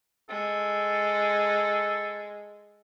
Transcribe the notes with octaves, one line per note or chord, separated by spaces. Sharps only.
G#3 A4